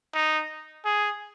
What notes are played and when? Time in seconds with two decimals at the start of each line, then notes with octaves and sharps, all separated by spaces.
0.14 D#4
0.85 G#4